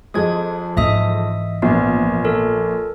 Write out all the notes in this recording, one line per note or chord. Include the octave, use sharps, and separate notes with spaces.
F2 G#3 D#6 G#6
G#2 E3 D#5 E5 D#6
A#1 B3
A4 A#4